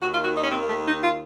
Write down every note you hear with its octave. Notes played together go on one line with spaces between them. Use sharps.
D#2 D#3 F#4
F4
F#4
D#4
C#4
C4
A#3
A3
D#4
F4